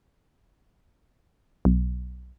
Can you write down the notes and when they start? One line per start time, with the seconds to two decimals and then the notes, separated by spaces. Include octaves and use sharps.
1.65 B1